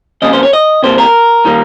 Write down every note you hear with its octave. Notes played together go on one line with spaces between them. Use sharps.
F2 C#3 G3 A#3 D#5
C5
C#5
D#5
C3 G3 A#3 C5
A#4
D#3 G3 A#3